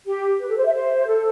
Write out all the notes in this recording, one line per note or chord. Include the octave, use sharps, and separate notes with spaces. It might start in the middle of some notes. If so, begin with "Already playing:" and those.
G4
B4
A4
C5
E5
C5
A4